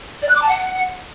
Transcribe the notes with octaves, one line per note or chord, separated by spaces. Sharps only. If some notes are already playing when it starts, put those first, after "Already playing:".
D5
F#6
D6
A5
F#5